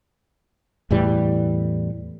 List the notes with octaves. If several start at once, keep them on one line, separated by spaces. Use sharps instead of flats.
E2 A2 E3 G3